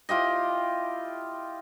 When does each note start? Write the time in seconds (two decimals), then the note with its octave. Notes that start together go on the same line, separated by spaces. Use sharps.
0.09 E4 F4 G4 D#5